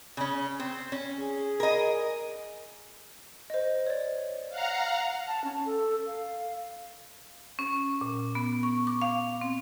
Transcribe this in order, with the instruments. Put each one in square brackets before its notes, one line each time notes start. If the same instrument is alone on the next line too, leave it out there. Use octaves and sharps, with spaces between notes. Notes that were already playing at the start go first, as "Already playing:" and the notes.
[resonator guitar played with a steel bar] C#3 C#4
C4
C#4
[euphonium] G#4
[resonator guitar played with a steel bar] A#4 D#5
[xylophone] C5 D#5
C#5 D5
[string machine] F5 F#5 A#5
[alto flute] A5
C#4
A4
F5
[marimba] C#4
A#2
B3
C#6
D6
F5
C4